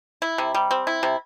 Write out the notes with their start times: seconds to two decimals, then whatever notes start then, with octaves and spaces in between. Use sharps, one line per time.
0.22 E4
0.38 C3
0.55 G3
0.71 C4
0.87 E4
1.03 C3